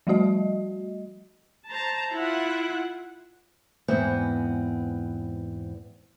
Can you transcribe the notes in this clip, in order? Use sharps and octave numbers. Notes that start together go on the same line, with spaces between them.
F3 G3 A3 F#4 D#5
C5 A5 A#5
E4 F4 F#5
E2 G#2 B3 C4